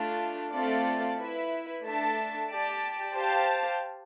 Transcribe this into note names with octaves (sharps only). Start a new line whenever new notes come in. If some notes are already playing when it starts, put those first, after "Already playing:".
Already playing: A3 D4 F4
A3 C4 F4 A4 D5
E4 B4 E5
A3 D4 A4 E5 A5
G4 D5 A5
G4 C5 F5 A5